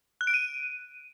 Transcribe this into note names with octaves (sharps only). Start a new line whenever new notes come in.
F#6
D7
D#7